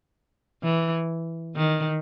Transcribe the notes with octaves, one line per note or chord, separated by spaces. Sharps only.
E3
D#3